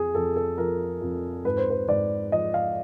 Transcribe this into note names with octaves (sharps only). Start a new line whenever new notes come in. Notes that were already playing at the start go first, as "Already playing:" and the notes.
Already playing: F2 G#4
F2 A4
A4
F3 A#4
F2
G#2 B4
C5
B4
G#2 D5
F3 D#5
F5